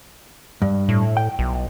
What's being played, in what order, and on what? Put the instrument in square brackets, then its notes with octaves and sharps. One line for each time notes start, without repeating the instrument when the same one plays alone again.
[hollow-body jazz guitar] G2
[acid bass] A2
[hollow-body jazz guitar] G5
[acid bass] B1